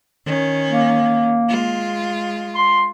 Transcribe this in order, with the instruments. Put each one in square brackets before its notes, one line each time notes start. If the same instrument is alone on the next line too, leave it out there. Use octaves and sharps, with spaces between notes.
[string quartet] D#3 C#4
[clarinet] A#3
[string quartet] G#3 F4
[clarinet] C6